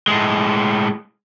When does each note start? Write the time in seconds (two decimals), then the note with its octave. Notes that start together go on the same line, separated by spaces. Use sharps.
0.08 A2 G#3